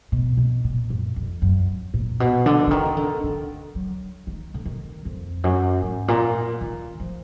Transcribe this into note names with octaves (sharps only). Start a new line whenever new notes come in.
B2
B2
A#2
F#2
F2
F#2
A#2
B2
D3
D3
D#3
D3
D3
F#3
D#3
D3
D#3
F2
F#2
G#2
A#2
D#3
F3